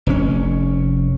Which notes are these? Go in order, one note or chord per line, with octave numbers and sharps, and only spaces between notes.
F1 A2 C#4